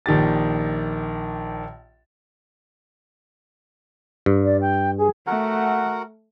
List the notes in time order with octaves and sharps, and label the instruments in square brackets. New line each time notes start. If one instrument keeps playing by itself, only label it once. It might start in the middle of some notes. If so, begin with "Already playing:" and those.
[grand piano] A#1 D#3 G4 A6
[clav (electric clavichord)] G2
[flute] D5
G5
G#4
[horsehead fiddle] A3 [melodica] F#4 A#4 F#5